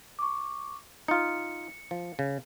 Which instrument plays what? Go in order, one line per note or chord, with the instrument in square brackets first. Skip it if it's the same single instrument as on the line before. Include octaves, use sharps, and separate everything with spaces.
[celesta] C#6 D6
[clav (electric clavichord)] D#4 F4 [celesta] C#7
[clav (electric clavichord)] F3
C#3